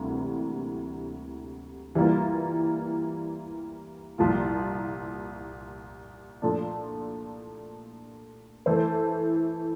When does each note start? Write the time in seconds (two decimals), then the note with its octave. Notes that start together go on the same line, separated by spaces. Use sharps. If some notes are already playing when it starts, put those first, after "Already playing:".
Already playing: D2 C3 E3 G3 A#3
1.95 E3 G3 A#3 F4
4.18 C2 A#2 F3 A#3 F4
6.42 A#2 F3 A3 D4
8.66 E3 A3 E4 A4 C5